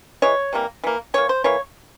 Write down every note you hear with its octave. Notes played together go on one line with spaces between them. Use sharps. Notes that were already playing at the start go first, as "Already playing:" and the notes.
E3 G#3 C#5
C3 E3 G3 A#3
E3 A#3
E3 A#3 C#5
C5
E3 A#3 C#5